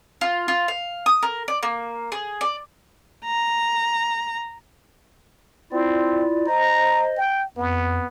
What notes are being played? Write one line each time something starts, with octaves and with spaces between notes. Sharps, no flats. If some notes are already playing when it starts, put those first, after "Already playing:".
F4
F4
F5
D#6
A#4
D5
A#3
G#4
D5
A#5
C4 E4 F4 D5
C5 D#5 A#5
G5
F2 B3